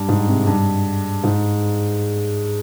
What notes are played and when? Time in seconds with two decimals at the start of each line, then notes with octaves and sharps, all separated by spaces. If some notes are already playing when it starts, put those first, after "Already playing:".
Already playing: G2
0.09 G#2
0.28 C3
0.47 G2
1.24 G#2